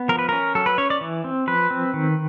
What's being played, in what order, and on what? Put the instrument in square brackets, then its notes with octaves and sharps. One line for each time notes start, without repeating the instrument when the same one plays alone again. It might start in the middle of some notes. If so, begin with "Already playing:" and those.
Already playing: [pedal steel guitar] B3
F3 A#4
B4
C#4 A#4
F#3 A4
B4
C#4 C#5
D5
E3
C4
F3 B4
C4
D#3